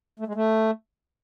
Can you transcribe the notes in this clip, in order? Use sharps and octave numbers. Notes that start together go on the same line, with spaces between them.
A3
G#3
A3